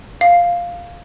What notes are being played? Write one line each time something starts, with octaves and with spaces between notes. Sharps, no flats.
F5